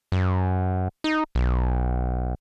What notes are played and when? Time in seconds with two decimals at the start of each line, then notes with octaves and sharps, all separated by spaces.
0.12 F#2
1.04 D#4
1.35 B1